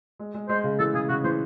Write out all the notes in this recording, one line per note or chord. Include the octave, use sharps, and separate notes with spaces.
G#3
G#3
G#3 C5
C#3
E3 A4
C#3 G#4
C#3 F#4
E3 C5